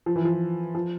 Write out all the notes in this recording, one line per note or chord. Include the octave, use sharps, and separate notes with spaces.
F3
E3
F3
F3